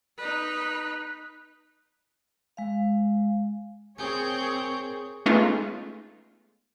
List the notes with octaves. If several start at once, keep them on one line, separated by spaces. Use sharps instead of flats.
D#4 B4
G#3 F5
C4 G#4 A#4 C#5 G#5 G6
G#3 A3 B3 C#4 D#4 F4